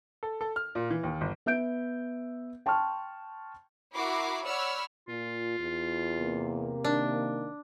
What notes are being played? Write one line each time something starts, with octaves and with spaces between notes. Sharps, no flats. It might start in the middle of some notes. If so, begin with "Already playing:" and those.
A4
A4
F6
A#2
E3
D#2
G1
B3 E5 G6 D7
G5 A5 C6 C#6 F6
E4 F#4 A#4 B5 D6 C7
C#5 D5 F#5 B5 E6 F6
A#2 F4
E2
C3 A#3
D#3 D4